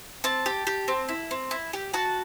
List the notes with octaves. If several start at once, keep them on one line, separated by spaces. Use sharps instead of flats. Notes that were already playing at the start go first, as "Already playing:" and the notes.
C4 A5
G4
G4
C4
E4
C4
E4
G4
F#4 A5